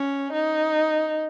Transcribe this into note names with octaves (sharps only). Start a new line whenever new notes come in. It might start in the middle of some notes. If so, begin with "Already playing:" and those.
Already playing: C#4
D#4